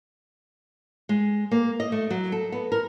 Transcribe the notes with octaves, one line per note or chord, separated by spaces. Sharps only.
G#3
A#3
D#5
A3
F#3
A4
B3
A#4